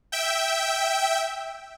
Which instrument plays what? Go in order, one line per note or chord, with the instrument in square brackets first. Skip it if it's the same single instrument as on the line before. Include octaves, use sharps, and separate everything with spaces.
[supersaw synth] E5 G5